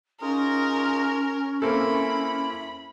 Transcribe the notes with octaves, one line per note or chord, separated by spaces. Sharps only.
C#4 D#4 F4 G#4 A#4
A#3 C4 E4 A4 B5